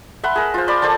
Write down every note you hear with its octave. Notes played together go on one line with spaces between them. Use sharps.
E5 F#5 B5 C6
G#4 A#4
F4 C5
A#4 D5 B5 C6
A4 C5 D5 A5